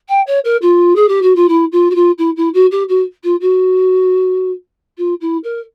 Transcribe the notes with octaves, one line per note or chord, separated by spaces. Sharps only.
G5
C#5
A#4
F4
G#4
G4
F#4
F4
E4
F4
F#4
F4
E4
E4
F#4
G4
F#4
F4
F#4
F4
E4
A#4